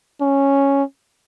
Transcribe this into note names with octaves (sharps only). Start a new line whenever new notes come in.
C#4